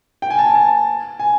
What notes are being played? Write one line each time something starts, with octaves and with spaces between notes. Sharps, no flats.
G5
G#5
A5
G#5
A5
G#5